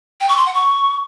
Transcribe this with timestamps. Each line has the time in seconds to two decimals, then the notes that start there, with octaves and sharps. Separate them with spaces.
0.20 G5
0.29 C#6
0.37 C6
0.46 F#5
0.54 C#6